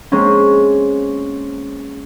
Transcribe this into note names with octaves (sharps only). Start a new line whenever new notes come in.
G#3 A#3 C4 C#4